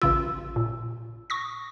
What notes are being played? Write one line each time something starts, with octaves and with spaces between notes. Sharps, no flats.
A1 C#3 F4 E6
A#2
C#6 D#6 A#6